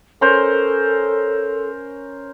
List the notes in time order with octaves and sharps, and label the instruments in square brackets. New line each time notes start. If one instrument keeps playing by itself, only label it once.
[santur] C#4 A#4 C5 [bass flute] A4